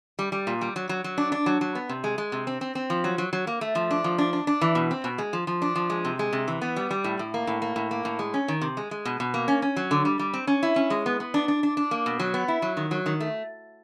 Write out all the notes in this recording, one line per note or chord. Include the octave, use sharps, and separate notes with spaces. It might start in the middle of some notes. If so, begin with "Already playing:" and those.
G3
G3
A#2
G3
F#3
F#3
F#3
D4
D4
F#3
F#3
B3
C3
G#3
G#3
C3
C4
C4
C4
F3
F#3
F#3
F#3
A#3
A3
F3
D4
F3
D4
D4
D4
E3
B2
C4
B2
G#3
F3
F3
D4
F3
G#3
C3
G#3
C3
E3
B3
G3
G3
A2
A2
A#3
A2
A#3
A2
A#3
A2
G#3
C#4
D#3
C3
G#3
G#3
B2
B2
A#3
C#4
C#4
F#3
D3
G3
G3
C4
C#4
E4
C#4
G#3
B3
B3
D4
D4
D4
D4
A#3
B2
F#3
B3
E4
F#3
D#3
F#3
D#3
A3